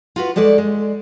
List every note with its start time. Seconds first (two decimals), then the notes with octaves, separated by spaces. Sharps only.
0.16 F4 F#4 B4
0.36 G3 G#3 A4 C#5 D5
0.58 G#3